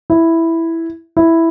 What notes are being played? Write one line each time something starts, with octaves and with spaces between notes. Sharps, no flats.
E4
E4